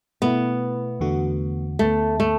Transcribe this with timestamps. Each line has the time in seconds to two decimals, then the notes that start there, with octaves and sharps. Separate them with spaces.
0.22 B2 A3 B3 E4
1.00 E2 D3 A3 F#4
1.79 D2 D3 A3 B3
2.20 A3